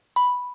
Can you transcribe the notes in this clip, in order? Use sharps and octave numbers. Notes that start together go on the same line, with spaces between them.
B5